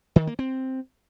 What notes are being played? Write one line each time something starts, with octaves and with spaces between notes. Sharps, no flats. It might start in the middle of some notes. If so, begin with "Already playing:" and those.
D#3
A#3
C4